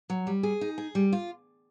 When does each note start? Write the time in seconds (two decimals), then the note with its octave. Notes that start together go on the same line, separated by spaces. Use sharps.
0.10 F#3
0.27 G3
0.43 G#4
0.61 D#4
0.78 G#4
0.95 G3
1.13 F4